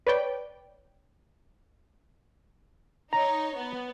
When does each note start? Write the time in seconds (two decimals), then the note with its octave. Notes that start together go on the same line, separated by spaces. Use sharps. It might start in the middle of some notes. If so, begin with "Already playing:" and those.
0.07 B4 C#5 D5 G5
3.13 D#4 C#5 A#5
3.55 B3